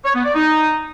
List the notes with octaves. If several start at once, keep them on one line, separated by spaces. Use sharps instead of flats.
C#5
B3
D5
D#4